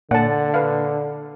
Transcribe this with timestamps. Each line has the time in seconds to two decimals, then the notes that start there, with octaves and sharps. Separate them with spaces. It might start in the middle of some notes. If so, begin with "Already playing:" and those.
0.11 A#2 D3 F#5 A5
0.54 B4 F5